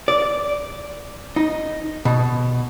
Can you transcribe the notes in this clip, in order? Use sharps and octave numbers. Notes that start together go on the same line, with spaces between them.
D5
D#4
B2